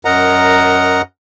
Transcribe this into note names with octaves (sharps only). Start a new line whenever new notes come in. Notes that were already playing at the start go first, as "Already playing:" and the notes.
F#2 A#4 D#5 F#5 A#5